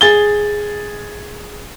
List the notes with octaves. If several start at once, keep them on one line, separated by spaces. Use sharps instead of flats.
G#4 A6 G7